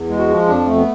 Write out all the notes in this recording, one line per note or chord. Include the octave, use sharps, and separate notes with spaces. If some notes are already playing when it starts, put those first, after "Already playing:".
Already playing: E2
G#3
F#4
F3
F2 D4
A3
B3